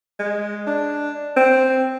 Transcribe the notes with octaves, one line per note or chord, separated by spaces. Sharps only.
G#3
D4
C4